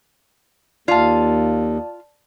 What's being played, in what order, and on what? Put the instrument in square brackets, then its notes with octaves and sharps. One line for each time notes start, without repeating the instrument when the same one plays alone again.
[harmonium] D#2 [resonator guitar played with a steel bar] F4 F5 [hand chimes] D5 A5